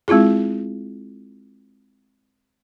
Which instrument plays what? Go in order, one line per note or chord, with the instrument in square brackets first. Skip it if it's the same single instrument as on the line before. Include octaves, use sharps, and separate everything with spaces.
[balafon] G#3 C4 E4 F4 G#4